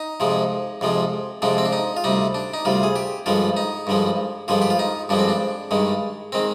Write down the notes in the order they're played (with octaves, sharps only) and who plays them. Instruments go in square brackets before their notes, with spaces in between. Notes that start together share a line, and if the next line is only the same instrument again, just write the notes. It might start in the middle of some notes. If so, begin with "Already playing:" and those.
Already playing: [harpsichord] D#4
F2 C3 F3 G#3
F2 C3 F3 G#3
F2 C3 F3 G#3 D4
C4
D4
D#4
F4
D2 C3 G3 D#4
D4
D#4
D2 C3 G3 F4
G#4
G4
G2 D3 F3 G#3 F4
D#4
G2 D3 F3 G#3
G2 D3 F3 G#3 F4
G4
F4
D#4
G2 D3 F3 G#3 D4
C4
D4
G2 D#3 G#3
D#3 G#3 C4